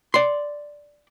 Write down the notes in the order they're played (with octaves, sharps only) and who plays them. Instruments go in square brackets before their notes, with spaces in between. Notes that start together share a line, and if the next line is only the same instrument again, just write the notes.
[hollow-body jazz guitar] D5 C6